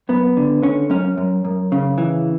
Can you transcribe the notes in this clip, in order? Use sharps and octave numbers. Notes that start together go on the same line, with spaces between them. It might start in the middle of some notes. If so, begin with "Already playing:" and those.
F#2 B3
D3
D3 C#4
F#2 C#4
F#2
F#2
C#3
E3